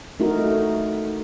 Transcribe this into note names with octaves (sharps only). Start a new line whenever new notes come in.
A3 D#4 E4 F#4 A#4